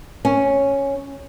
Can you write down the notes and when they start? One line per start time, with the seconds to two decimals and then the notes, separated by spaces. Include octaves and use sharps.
0.25 C#4